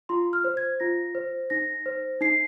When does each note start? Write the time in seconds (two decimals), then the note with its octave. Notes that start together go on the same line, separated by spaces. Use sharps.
0.09 F4 C6
0.33 F6
0.44 C5
0.57 G#6
0.80 F4 A#6
1.15 C5
1.50 D#4 A#6
1.86 C5
2.21 D#4 C7